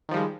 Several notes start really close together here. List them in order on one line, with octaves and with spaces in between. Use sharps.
D#3 F3 G3 G#3